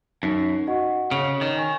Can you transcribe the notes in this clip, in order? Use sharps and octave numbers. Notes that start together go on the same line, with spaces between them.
F#2 D#4
F#4 D#5 F#5 C#6
C#3 C#5
D#3
G#5 C#6